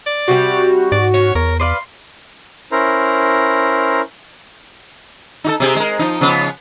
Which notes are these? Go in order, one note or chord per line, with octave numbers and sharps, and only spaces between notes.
D5
C3 F3 G3 F#4
G#2 D5
C#4 C#5
E2 A#4 C#5
B4 D5 F5 C6
C#4 E4 A#4 C5 A#5
D#4 F#4 A4
C3 C4 G#4
G#3 A#4
F3 D#4
C#3 F3 B3